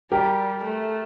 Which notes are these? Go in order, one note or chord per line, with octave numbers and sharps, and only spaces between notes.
G3 G4 A#4
A3